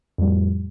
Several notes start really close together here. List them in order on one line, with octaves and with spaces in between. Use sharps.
F2 G3 A2